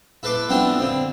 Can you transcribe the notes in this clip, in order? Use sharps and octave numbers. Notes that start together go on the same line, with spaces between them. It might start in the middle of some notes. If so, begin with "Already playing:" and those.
E4 A4 B4 C6 D6
B3 C4 D4 E4 F4
D3 C4